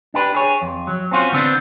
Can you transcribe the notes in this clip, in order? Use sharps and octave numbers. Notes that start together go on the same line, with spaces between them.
D4 G4 B4
G#4 C#5
F2
F#3
C4 C#4 F4 F#4
D3 B3 C4 D4